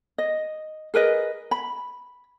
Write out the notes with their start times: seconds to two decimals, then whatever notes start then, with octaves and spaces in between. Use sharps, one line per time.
0.18 D#5
0.94 G#4 A#4 B4 D#5
1.51 B5